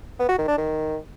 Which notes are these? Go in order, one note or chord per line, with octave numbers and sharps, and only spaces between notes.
B3
F#4
D#3
D4
D#3